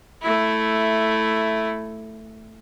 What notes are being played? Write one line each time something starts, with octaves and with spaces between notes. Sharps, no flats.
A3 E4